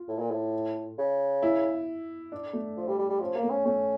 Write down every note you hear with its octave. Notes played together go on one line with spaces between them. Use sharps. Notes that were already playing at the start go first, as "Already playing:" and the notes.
Already playing: F4
A2
A#2
A2
C#3
E4
D4
A3
F3
G3
G3
G3
F3 C#4
A#3
A3
C#4
A3 C#4